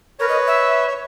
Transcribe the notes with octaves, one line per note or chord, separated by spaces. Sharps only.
A#4 B4 C#5
D#5
E5
C#5